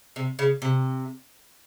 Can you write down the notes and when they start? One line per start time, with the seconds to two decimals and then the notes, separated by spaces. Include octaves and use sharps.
0.16 C3
0.39 C#3
0.62 C3